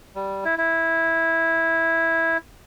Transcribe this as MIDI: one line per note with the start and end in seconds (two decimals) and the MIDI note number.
0.15 0.44 55
0.45 0.55 64
0.58 2.37 64